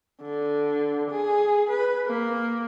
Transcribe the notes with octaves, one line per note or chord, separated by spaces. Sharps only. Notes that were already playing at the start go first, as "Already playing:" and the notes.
D3
G#4
B4
A#3